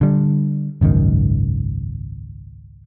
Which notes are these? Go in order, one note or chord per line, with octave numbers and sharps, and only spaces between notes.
D3 G3
G#1 C#2 F#2 D#3